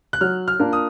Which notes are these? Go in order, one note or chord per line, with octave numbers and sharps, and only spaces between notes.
F#6
F#3 F6
F6
A#3 D4 F4 A#4
D#6